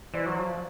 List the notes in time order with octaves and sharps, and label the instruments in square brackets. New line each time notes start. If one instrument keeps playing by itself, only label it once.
[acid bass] E3 [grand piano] C5 D5
[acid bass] F#3
F3